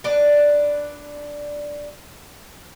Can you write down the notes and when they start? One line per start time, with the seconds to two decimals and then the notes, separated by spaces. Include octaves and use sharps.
0.04 D4 B4